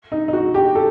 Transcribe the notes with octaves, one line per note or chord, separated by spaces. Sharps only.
D#4
D#4
F#4
G4
A4